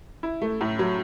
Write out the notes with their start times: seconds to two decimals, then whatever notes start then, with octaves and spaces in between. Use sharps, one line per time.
0.23 E4
0.42 A3
0.61 A2
0.79 F#3